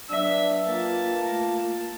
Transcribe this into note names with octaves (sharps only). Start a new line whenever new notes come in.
F#3 D4 B4 E5
A#3 F4 B4 G5 A5
A3 F4 A#4